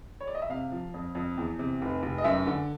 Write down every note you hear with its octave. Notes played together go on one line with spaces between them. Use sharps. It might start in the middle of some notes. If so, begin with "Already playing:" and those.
C#5
D5
D#5
E5
C3 F5
F3
F2
F2
E2
C3
F1
F1
D#5
F#2 E5
D3